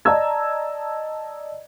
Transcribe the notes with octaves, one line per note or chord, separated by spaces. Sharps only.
D5 D#5 A5 A#5 E6 G#6